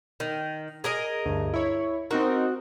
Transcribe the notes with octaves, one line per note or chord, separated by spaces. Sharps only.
D#3
G#4 A#4 D#5
D2 G2
E4 C#5
C4 D#4 F#4 A#4